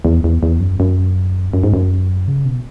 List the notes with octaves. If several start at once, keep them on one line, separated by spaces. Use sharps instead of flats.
E2
E2
E2
F#2
F#2
F#2
G#2
F#2
C#3
B2